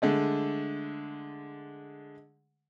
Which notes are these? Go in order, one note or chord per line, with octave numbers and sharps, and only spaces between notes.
D3 G#3 A3